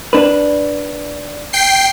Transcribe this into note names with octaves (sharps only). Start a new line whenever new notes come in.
D4 B4
G5 C7